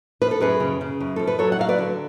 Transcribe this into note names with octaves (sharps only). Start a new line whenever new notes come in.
F3 B4
A4
F#2 G#4 B4
C#3
C#3
F#2
F3 A4
B4
F#3 A4 C#5
F#5
F#3 F5
B4 D5
D3